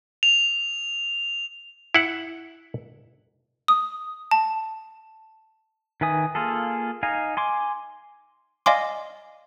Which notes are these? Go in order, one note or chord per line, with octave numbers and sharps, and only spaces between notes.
F7
E4 F#5
D#6
A5
D#3 B4 E5 G#5 D#6
A#3 F4 G#4 A4
D#4 D#5 F5 G#5
G#5 C6 D6
D5 D#5 F5 G#5 C6 D6